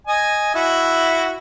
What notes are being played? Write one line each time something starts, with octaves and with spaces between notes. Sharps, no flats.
D#5 G#5
E4 F#4